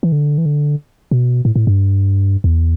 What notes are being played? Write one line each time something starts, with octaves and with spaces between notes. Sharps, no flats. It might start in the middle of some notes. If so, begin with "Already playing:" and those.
E3
D3
E3
D3
B2
A2
A2
G2
E2